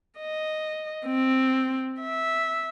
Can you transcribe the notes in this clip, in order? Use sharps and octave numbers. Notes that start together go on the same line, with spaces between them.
D#5
C4
E5